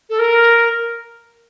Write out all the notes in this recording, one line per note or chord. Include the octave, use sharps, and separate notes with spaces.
A4
A#4